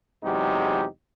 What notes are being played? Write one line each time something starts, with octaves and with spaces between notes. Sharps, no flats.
E2 C3 F#3 G#3 D#4 G4